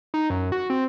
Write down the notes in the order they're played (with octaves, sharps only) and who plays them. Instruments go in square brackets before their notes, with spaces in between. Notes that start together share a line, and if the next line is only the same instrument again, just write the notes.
[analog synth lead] D#4
F#2
F#4
C4